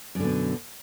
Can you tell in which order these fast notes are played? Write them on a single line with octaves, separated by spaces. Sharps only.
F#2 D3 B2